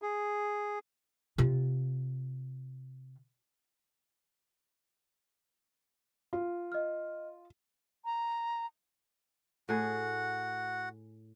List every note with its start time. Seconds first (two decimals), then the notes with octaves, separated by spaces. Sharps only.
0.02 G#4
1.38 C3 F4
6.33 F4
6.72 D#5 F6
8.05 A#5
9.69 A2 F#4 G#4 F#5